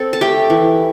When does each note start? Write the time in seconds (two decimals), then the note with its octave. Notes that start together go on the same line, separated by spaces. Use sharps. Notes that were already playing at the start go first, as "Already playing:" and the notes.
Already playing: C4 A4
0.13 A5
0.21 A3 G4 G5
0.50 E3